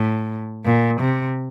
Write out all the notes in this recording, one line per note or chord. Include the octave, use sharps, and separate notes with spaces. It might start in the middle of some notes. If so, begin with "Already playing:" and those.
Already playing: A2
A#2
C3